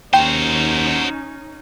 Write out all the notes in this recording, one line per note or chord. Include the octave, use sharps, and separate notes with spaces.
D#2 C#4 D#4 F#4 C5 G5 C7